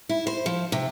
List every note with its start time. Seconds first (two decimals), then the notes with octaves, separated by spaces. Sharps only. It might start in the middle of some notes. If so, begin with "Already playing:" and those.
0.09 E4
0.27 C5
0.46 F3
0.72 C3